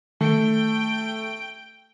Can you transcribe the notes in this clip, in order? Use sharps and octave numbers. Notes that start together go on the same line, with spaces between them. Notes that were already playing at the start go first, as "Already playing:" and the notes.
D#3 A3 G5 D7